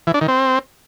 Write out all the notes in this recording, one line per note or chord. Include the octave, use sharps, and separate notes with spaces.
E3
D4
D#3
C4